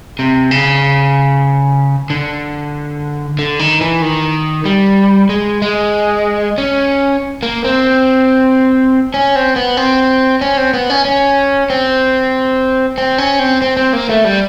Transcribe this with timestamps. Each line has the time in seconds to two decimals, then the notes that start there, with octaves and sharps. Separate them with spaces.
0.19 C3
0.51 C#3
2.10 D3
3.39 D3
3.59 D#3
3.81 E3
4.02 D#3
4.65 G3
5.29 G#3
5.62 G#3
6.58 C#4
7.43 A#3
7.64 C4
9.14 C#4
9.36 C4
9.56 B3
9.77 C4
10.41 C#4
10.57 C4
10.74 B3
10.90 C#4
11.05 C#4
11.70 C4
12.98 C4
13.18 C#4
13.39 C4
13.62 C4
13.77 C4
13.93 A#3
14.10 A3
14.25 G3